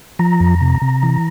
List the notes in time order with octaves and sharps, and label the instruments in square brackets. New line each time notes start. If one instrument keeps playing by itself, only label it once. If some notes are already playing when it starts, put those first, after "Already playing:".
[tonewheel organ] F3 A#5
F2
C3
C3
E3